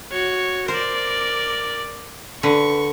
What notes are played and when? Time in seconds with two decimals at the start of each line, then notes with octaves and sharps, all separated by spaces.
0.11 F#4 C#5
0.68 A#4 C5 D5
2.43 D3 B4 C#6